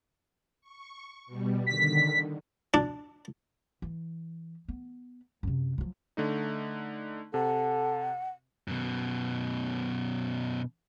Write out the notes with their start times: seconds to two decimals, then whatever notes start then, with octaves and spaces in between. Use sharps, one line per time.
0.61 C#6
1.26 B2 G3
1.67 D3 D#3 B6
2.74 D4
3.82 E3
4.68 B3
5.43 F#2 C3
5.78 F3 F#3
6.17 D3 A3 D#4
7.34 C3 A4 F#5
8.68 F#2 B2